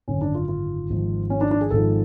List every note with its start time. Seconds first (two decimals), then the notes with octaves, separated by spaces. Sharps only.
0.08 G#1 F#2 D3 C#4
0.21 D4
0.35 F4
0.48 F4
0.89 G#1 G#2 F3
1.30 C#4
1.41 D4
1.51 D4
1.61 G#4
1.70 G#1 G#2 F3 A4